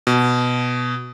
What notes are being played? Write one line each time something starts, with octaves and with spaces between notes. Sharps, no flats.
B2